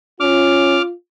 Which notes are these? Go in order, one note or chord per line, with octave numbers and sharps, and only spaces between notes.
C#4 F4 D6 F6